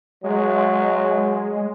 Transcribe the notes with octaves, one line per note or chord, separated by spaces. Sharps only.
F#3 G#3